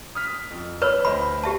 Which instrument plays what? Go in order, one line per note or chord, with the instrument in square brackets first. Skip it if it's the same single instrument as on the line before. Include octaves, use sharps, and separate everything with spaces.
[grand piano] D#6 F6 B6
F2
[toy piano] B4 C#5 [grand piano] B5 E6 F6
[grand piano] D2 C5 D#5 [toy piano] B5
[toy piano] G4 E5 A5